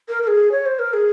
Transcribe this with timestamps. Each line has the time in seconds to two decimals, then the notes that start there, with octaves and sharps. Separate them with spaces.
0.09 A#4
0.23 A#4
0.27 G#4
0.52 C#5
0.66 C5
0.79 A#4
0.93 G#4